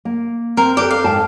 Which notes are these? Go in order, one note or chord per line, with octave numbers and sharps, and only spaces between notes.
A#3
C4 A#4
G4 A4 B4 D5
F5
G#2 G5 A5